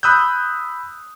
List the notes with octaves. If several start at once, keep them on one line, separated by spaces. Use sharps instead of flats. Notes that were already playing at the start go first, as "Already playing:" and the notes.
B5 D#6 E6 F#6 G6